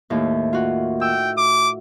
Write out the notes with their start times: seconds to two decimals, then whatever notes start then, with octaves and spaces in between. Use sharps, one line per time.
0.10 D#2 A2
0.53 F4 F#4
1.01 G5 E6
1.38 D6